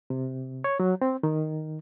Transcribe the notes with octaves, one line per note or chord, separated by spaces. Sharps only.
C3
C#5
F#3
C4
D#3